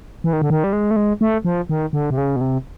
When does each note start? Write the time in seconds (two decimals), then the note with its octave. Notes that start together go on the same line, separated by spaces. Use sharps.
0.24 E3
0.33 D#3
0.42 D3
0.50 D#3
0.64 G3
0.73 G#3
0.91 A3
0.96 G#3
1.21 A3
1.45 F3
1.69 D#3
1.93 D3
2.10 C3
2.18 C#3
2.36 B2
2.41 C3